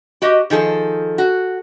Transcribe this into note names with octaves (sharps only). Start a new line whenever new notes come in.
F#4 G4 D#5
D#3 F3 G#4 A4
F#4